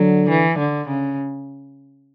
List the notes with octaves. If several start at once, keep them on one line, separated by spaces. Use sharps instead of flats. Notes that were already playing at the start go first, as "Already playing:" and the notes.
Already playing: D3 F#3
E3
D3
C#3